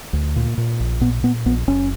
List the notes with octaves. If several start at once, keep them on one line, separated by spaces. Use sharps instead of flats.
D2
A#2
A#2
A#1
A#2 B3
A#2 B3
A#1 B3
F#1 C#4